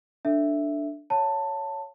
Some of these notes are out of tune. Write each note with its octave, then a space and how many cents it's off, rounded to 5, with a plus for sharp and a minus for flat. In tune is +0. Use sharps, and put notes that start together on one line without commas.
D4 +0 A4 +10 E5 +0
C#5 +5 F5 +0 A5 +15